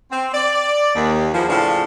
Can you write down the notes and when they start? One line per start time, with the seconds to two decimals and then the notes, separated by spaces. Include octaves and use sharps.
0.11 C4
0.34 D5
0.95 D#2
1.34 E2 E3 F3
1.48 A2 C#3 F3 D4